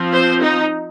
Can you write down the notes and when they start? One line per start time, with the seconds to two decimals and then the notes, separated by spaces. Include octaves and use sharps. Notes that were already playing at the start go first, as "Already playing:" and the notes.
Already playing: F3 C4
0.13 C5
0.42 D#4